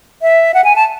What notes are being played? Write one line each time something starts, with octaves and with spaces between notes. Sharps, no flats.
E5
F#5
G#5
A5